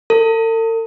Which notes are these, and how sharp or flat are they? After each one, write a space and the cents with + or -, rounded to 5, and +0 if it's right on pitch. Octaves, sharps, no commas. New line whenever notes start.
A4 +45